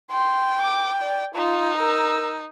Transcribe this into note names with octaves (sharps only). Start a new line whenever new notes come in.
G5 C6
D6
D5
D#4 F4
A#4 E6